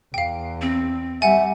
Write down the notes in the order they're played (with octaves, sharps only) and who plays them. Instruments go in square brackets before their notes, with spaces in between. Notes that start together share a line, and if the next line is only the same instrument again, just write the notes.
[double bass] E2 [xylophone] F5 G5
[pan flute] C4
[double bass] G3 [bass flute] E5 [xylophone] F#5 G#5